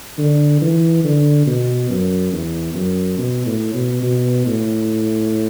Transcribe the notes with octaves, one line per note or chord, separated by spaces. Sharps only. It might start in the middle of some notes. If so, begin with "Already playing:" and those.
D3
E3
D3
B2
F#2
E2
F#2
B2
A2
B2
B2
A2